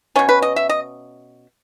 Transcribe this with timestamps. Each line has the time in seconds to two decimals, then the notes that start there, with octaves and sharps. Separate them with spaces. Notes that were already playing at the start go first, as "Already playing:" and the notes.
0.16 B2 A3 C#4 C#5
0.29 B4
0.42 D#5
0.56 E5
0.69 D#5